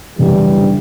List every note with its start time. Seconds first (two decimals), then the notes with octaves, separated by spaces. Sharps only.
0.18 F#1 E2 D3 E3 G3
0.62 D3